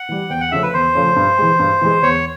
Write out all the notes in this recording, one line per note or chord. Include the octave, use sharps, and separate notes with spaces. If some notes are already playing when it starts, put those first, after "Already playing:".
Already playing: F#5
E3 G3
E2 G5
F#5
C#3 F3 A3 C#4 E5
B4
E2 C5
C#3 F3 A3 C#4
G2
E3 G#3
G2
E3 G#3
E2 C#5